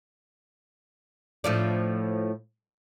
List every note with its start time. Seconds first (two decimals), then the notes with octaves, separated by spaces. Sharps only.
1.44 A2 F3 D4